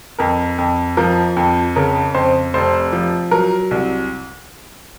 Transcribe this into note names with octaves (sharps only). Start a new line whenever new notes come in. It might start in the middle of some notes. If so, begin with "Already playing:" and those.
F2 A#4
F2
F3 A#4
F2
C#3 A#4
F2 C5
F1 C5
F3
F#3 A#4
C2